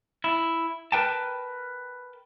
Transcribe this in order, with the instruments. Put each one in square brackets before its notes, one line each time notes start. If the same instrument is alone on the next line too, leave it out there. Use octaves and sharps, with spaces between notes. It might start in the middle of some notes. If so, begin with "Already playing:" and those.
[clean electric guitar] E4
A#4 B4 G5 A5